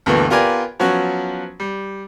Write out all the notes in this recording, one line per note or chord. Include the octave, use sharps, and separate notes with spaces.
D2 G2 B2 D3 E3 A#3
B3 F4 G4 A#4 D5 G#5
F3 F#3 B3 C#4 F#4
G3